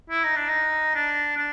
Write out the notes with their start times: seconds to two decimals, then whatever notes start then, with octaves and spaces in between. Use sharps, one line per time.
0.10 E4
0.24 D#4
0.36 D4
0.49 D#4
0.95 D4
1.37 D4